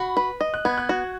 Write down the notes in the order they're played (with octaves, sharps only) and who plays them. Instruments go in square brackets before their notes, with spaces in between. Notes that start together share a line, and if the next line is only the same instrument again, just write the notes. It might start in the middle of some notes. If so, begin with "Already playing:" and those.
Already playing: [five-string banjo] F#4 [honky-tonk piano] B5
[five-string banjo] B4
D#5
[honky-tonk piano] F#6
[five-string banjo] B3 [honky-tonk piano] G#6
[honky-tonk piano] F#6
[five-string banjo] F#4